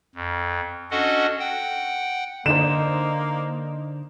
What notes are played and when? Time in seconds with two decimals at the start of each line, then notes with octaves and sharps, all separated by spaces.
0.15 F2
0.91 C#4 D4 F#4 A4 D#5 F#5
1.39 F#5 G5
2.46 D3 A#3 D4 D#4 C5 E7